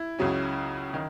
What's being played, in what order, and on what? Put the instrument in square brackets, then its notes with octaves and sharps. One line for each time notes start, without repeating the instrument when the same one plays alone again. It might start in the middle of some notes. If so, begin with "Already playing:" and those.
Already playing: [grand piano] E4
[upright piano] C#2 C#3 F#3 C#4
D#3